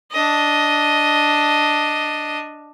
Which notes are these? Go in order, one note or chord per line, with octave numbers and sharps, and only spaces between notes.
D4 D#5